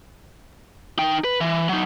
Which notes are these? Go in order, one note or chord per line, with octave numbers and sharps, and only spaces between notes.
D#4 G5
B4
E3
F#3 D#4